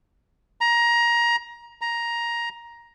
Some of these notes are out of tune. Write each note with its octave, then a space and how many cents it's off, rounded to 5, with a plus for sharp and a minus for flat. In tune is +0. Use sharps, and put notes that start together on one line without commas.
A#5 +20
A#5 +10